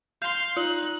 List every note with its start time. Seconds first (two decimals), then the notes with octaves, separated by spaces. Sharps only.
0.22 F5 C6 G6
0.56 D#4 F4 F#6